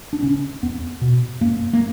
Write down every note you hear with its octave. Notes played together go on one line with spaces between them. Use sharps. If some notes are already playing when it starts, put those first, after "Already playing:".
D4
C#3 C#4
E2 B3
B2
F#2 A#3
A#3